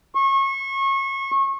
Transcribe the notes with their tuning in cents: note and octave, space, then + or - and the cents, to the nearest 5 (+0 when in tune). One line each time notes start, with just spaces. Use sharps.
C#6 -30